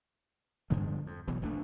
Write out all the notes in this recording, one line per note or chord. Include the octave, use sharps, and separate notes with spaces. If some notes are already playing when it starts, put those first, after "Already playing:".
G2 D3 F3 G#3
F2
F1 B1 B2 E3
D1 A#1 A3 D4